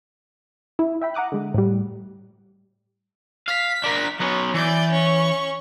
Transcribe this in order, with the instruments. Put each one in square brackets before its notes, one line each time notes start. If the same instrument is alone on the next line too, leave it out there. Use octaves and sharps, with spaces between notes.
[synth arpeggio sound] E4
E5 G5 B5
F#5 A#5 D6 D#6 F#6
D3 G#3
A2 G3
[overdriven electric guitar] F5 [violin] B6
[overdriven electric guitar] D4 A#4
[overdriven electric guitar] F#3 B3 [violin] C#4
[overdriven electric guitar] E3 [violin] D5 G6
[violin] C#4 C#6